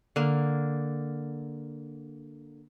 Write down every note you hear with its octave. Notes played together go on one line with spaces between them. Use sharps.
D3 A#3